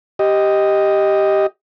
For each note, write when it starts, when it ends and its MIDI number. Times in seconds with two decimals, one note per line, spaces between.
0.19 1.46 67
0.19 1.46 75